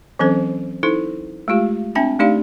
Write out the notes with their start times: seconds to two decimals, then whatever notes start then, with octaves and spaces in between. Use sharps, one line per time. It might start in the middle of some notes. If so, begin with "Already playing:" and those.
0.19 E3 F#3 C4 C#4 A4 C5
0.83 D#4 E4 A4 C5
1.48 G#3 A3 F4 G4
1.95 C4 D4 E5 G5 A5
2.19 A3 D4 D#4 G4 D5 F5